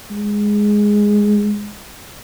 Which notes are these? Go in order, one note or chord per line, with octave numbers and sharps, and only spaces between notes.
G#3